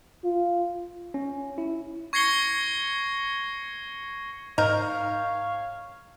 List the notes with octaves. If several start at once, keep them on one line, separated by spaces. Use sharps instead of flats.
F4
C#4
E4
C#6 G#6 A#6 C7 C#7 G7
G#2 A#4 C#5 D#5 F5 G6